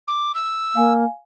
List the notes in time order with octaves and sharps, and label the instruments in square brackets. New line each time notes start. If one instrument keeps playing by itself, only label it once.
[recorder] D6
E6
[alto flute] A#3 [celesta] F5 G#5